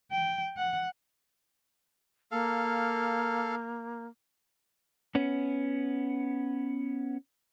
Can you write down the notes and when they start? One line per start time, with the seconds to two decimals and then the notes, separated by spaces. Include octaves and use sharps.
0.12 G5
0.57 F#5
2.32 A#3 A4 F5
5.15 B3 C#4